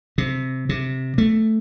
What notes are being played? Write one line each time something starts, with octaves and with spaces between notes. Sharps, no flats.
C3
C3
A3